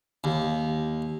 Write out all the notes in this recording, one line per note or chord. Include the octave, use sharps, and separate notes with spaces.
D#2